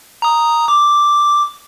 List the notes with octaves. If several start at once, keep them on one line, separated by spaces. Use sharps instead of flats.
A#5 D#6
D6